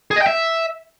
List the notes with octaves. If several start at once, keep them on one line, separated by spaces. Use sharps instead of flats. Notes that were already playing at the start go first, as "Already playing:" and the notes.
G#4
D#5
G5
E5